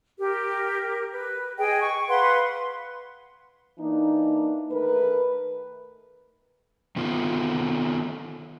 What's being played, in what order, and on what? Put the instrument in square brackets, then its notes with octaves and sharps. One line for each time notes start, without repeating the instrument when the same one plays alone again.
[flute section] G4 A#4
B4
G#4 D#5 G5
C#6
B4 F5 F#5 C6
[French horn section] E3 A#3 D4 D#4
D#3 A3 A#4 B4
[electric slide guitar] D#3 A3 B3 F4